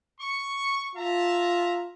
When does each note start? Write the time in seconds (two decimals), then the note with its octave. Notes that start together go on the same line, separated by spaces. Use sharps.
0.20 C#6
0.95 F4 E5 A5 A#5